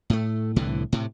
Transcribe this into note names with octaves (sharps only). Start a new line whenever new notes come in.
A2 A3
C2 A2 D3 E3
A2 C3